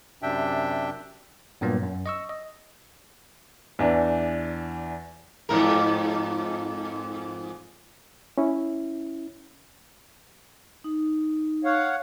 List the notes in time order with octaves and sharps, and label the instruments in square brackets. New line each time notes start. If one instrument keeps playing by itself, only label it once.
[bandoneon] F#2 C3 D4 E5 G5
[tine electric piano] G2 A#2 F#3 A#3 B3
F#2
D#5 C#6 E6
D#5
[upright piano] E2 E3 D4
[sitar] F2 G#2 A#4
[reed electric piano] C#4 E4
[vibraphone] D#4
[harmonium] C#5 F5 F#5